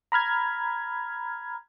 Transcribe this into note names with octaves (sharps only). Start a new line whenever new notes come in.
A#5 B5 F6 G#6